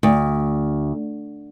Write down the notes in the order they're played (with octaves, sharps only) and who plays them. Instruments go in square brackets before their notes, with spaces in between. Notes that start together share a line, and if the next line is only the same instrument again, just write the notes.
[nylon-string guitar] D2